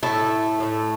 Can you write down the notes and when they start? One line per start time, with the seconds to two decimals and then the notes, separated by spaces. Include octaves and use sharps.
0.03 A2 A3 E4 A4
0.60 A2 A3